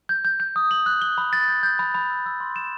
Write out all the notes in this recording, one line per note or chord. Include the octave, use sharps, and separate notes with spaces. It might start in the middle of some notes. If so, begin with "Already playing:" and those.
G6
G6
G6
D#6
F#7
F#6
G7
B5
A6
G6
G6
B5
B5
E6
E6
C6
E7